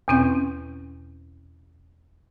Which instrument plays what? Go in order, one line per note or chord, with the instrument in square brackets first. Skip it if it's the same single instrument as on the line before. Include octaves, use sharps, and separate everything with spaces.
[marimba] E2 B2 C4 C#4 G6